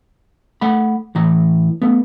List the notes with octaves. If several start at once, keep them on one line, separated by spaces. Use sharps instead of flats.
A3 F#5 B5
A2 E3 A#5
A3 B3